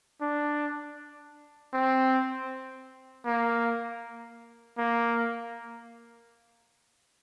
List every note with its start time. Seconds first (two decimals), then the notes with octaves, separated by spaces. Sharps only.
0.21 D4
1.74 C4
3.26 A#3
4.78 A#3